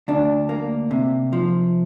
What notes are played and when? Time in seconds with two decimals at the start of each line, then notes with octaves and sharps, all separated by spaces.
0.08 D2 D4
0.49 A#3
0.91 C3
1.33 F3